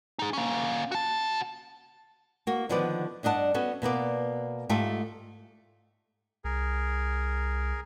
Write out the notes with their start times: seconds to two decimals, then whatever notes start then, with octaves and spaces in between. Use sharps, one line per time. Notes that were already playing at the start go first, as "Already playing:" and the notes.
0.19 D#4 G#4
0.33 A#3 C#4
0.92 F#4 A5
2.47 A#3 F#4
2.69 D3 D#3 F3 B3 B4 D5
3.23 G2 D4 D#5 F#5 A5
3.54 B3 C#4 F#4 A4
3.82 B2 A#3 B3 D5
4.69 G#2 A3 F4 G4 E5 A5
6.44 C2 G#4 A#4